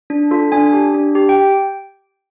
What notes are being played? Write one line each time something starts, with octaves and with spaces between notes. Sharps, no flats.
D4
F4 A4
D4 G#5
G4
D4
G4
G5